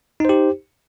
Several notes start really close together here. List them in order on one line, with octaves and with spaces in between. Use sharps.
D#4 C5 G4